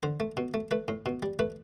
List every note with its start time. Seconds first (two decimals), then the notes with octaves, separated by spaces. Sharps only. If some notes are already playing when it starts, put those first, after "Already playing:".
0.03 D3 C5
0.20 A3
0.37 B2
0.54 A3
0.71 A3 B4
0.88 A2
1.06 B2
1.23 G3
1.39 A3 B4